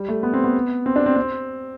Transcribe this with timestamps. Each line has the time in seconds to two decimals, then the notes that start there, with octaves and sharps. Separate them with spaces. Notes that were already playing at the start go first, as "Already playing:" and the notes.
Already playing: G3
0.09 A3
0.23 B3
0.33 C4
0.44 B3
0.86 C4
0.96 D4
1.06 C4
1.16 C4